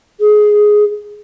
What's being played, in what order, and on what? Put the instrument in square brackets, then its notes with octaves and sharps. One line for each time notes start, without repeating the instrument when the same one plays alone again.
[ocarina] G#4